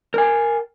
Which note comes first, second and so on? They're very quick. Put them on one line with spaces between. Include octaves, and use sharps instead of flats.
A#4 G#5 G5